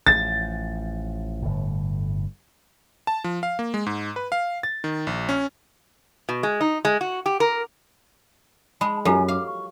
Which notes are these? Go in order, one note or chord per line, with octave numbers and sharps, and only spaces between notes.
A1 F3 A6
G1 A2
A5
F3
F5
A#3
G#3
G#2
B4
F5
A6
D#3
A#1
C#4
B2
G#3
D#4
G#3
F#4
G4
A#4
G#3 A5 B5
F#2 F4 G4 A4 G#5
F5 D6
C#6